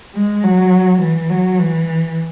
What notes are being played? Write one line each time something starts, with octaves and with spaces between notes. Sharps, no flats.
G#3
F#3
E3
F#3
E3